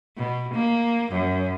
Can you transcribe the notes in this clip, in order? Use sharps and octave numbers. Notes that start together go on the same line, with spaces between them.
B2
A#3
F#2